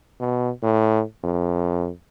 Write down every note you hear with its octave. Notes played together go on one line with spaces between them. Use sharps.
B2
A2
F2